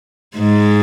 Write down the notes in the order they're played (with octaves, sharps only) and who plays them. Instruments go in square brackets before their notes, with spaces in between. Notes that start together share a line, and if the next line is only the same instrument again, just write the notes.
[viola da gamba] G#2 G#3